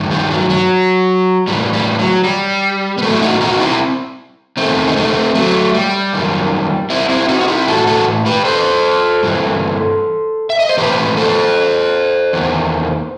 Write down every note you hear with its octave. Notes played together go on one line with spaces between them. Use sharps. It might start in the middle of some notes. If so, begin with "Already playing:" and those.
Already playing: G2 D#3
G3
F#3
F#3
A2 E3 G3
G3
F#3
G3
B3
A2 E3 F#3 A3
E4
D#4 F#4
D#4 F#4
C4 E4
E2 D#3 A3 C4
D#4
A3 C4
F#3 A3
G3
F#2 D#3
C4 E4
C4 E4
D#4 F#4
F#4
E4 G4
A2 E3 F#4 A4
F#4 A4
G4 B4
A4 C5
G2 E3
E5
D#5
C5
A2 E3 G4 B4
A4 C5
E2 D#3